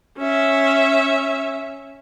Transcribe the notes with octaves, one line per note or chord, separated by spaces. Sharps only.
C#4 E5